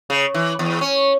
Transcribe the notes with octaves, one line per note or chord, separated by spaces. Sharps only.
C#3
E3
E2
C#4